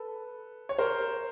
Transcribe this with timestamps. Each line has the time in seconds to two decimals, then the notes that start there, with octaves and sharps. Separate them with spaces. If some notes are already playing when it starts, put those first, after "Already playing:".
Already playing: A4 B4
0.69 C#5
0.78 A#4 C5